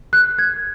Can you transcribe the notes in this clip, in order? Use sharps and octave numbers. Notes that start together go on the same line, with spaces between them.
F#6
G#6